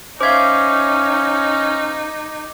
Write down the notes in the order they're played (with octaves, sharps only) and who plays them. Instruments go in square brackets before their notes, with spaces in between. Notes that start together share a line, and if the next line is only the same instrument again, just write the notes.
[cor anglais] C#4 [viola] D#4 [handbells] C5 E5 F5 [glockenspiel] D6 G#6